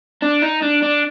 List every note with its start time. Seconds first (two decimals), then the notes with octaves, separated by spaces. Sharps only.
0.22 D4
0.42 D#4
0.62 D4
0.83 D4